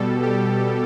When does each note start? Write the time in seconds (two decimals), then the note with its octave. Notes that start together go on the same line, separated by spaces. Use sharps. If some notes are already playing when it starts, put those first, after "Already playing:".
Already playing: B2 G3 A4
0.22 G4